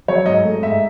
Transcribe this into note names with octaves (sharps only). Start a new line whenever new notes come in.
F#3 C#5
G#2 D#5
A3
G#2 E5